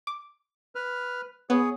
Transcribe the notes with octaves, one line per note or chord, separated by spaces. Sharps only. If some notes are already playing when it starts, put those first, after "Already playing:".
D6
B4 F6
B3 G#4 C#5